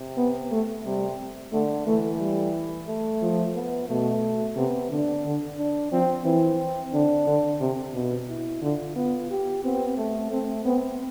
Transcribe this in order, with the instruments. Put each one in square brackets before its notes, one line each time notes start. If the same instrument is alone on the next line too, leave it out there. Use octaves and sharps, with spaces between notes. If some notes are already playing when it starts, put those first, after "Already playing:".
Already playing: [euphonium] C3
[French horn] B3
A3
[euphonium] C3 [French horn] G3
[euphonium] D3 [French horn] A3
[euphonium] E3 [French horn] A3
[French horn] G3
[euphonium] A3
[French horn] F3
[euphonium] B3
[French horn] B2 [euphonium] A3
[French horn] C3 [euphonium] B3
[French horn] D3 [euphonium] D4
[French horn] D3
[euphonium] D4
[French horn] F3 [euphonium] C4
[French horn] E3 [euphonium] C4
[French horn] D3 [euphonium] D4
[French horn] D3
C3
B2
[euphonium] E4
[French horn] D3 [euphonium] F4
[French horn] B3 [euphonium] F4
[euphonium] G4
[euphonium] B3 [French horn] C4
[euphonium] A3
[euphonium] A3 [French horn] C4
[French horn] B3 [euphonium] C4